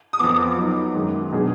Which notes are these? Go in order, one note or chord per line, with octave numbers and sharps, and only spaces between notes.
D#6
F2 F3 B3 D6
F#3 B3 D#4
F#2 D#3 G#3
B2 F#3 D4 G#4